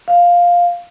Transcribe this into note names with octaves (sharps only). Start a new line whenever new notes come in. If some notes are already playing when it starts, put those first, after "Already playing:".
F5